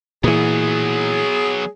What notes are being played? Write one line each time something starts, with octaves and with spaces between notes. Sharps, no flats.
A#2 E3 F#3 B3 G#4